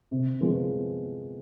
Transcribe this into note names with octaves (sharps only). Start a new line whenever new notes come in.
C3
F3 G#3 B3